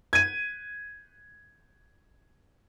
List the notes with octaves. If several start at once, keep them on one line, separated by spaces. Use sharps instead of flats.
G#6 D#7